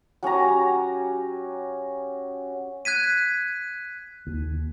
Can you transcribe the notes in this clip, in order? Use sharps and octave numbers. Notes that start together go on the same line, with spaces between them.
F#3 C#4 G4 A#5
F#6 G#6 B6 D#7
D#2